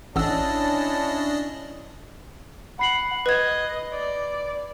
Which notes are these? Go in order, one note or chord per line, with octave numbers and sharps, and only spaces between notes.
A1 C#4 D4 E4 D#5 F#5 A5 E6
F#5 B5 C7 F#7
B4 D#5 G#6
D5